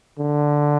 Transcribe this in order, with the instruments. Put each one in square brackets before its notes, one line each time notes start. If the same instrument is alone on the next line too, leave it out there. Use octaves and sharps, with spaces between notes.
[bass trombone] D3